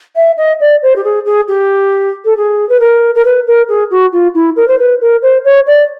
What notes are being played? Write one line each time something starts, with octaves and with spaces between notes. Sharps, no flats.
E5
D#5
D5
C5
G4
G#4
G#4
G4
A4
G#4
B4
A#4
A#4
B4
A#4
G#4
F#4
F4
E4
A#4
C5
B4
A#4
C5
C#5
D5